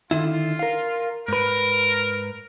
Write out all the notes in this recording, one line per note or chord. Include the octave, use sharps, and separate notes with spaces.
D3 D#3 E4 F4
A#4 F5
G#2 A#4 B4